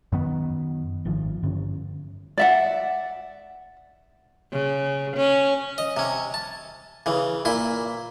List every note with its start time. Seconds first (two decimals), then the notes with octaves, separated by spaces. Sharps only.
0.12 F#2 D#3 B3
1.05 G#1 D#3 F3
1.43 G2 D3 C#4
2.38 D5 E5 F#5
4.52 C#3
5.16 C#4
5.78 D#5
5.97 C3 C#4
6.34 A5
7.06 C#3 E3
7.45 A#2 E4 C6